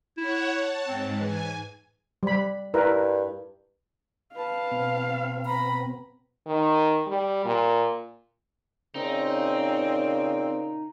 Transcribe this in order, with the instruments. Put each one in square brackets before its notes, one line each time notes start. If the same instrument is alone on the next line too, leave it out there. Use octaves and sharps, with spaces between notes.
[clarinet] E4 [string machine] C#5 F#5
[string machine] A5
[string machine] G#2 [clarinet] C4
[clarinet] E3 [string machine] G#5
[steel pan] G3 B5
[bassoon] G2 [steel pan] E4 A#4 B4
[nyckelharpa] B4 A5 [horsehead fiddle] F5
[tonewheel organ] B2 B3 C4
[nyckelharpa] A#5 [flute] B5
[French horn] D#3
G3
A#2
[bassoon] A#2 [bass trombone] C#3 [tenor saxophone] C4 [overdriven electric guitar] D#4